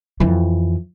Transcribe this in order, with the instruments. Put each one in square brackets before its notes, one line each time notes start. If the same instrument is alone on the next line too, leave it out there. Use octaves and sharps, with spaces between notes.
[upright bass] F2 E3